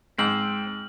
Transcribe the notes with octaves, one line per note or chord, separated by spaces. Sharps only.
G#2 C4 F6 F#7